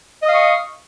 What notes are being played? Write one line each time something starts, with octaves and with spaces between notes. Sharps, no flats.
D#5 F5 C#6 D#6